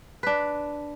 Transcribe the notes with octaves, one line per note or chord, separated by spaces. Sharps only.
D4 B4